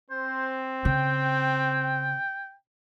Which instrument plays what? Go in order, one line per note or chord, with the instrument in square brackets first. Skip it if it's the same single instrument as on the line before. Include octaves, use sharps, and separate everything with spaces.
[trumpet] C4 [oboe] C5
[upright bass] C#3 [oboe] G5